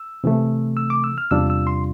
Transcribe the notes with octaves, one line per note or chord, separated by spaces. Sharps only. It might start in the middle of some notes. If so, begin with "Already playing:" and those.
Already playing: E6
C3 E3 A3
E6
D6
E6
F6
E2 C3 G3 D4 F4 E6
E6
C6